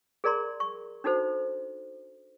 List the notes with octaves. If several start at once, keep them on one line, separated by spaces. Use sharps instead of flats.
G#4 A#4 D5 A#5 C6
C#6
D4 D#4 F#4 A4 C5